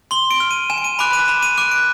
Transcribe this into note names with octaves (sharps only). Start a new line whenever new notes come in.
C6 G7
D7
F6
D#7
G#5 E7
D7
D#7
B5 D6 F#6 D7
D#7
B5 E7
D#7
D6 F#6 D7
D7